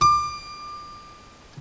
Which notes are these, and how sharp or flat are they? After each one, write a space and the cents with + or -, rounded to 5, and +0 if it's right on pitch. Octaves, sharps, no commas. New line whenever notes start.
D6 +25